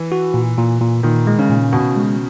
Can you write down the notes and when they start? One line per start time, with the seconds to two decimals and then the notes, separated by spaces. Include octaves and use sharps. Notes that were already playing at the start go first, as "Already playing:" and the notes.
Already playing: E3
0.12 F#4
0.34 A#2
0.58 A#2
0.81 A#2
1.03 A#2 D#3
1.27 G#3
1.39 C#3
1.50 A#2
1.73 B2 F#4
1.96 G#3